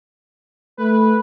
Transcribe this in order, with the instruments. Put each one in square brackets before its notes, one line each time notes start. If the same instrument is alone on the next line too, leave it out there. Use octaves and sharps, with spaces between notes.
[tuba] A3 [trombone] B4